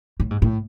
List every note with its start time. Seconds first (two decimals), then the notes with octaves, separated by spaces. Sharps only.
0.20 A2
0.31 G#2
0.42 A2